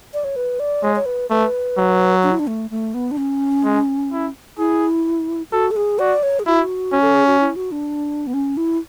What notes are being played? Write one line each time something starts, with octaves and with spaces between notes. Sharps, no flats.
D5
C#5
B4
D5
G#3 C#5
C#5
B4
A3 B4
F#3
D4
E4
D4
A3
A3
B3
D4
C#4
G#3
E4
E4 G#4
F#4 A4
A4
G#4
F#4 D5
C#5
G#4
E4 F#4
C#4
A4
G#4
F#4
E4
F#4
D4
B3
C#4
E4